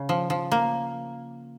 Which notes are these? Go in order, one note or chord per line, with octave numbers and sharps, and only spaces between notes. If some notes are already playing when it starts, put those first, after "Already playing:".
Already playing: C#3
F3
F3
A#3